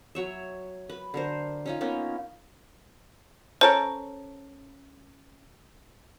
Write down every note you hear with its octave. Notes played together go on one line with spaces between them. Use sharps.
F#3 C#5 E5
B4
D3 A#4 C5
C#4 D#4 F4
A#3 B3 C#4 D#4
C#4 A4 A#4 C5